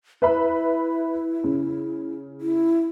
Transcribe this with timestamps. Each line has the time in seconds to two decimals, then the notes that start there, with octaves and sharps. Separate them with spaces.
0.22 E4 B4 E5 B5
1.44 C#3
2.41 E4